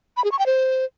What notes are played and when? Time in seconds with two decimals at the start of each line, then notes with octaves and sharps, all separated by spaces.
0.17 B5
0.24 G#4
0.32 C#6
0.39 G5
0.46 C5